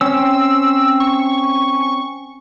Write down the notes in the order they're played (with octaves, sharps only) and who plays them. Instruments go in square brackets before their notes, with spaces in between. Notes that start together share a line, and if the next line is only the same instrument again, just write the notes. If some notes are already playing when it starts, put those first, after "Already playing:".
[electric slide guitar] C4 C#4 [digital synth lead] E6
[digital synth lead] C#6